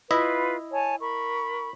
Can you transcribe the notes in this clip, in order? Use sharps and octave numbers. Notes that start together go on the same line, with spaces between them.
E4 F4 B4 D#5 E5
C#5 G#5 A5
A#4 B5 C#6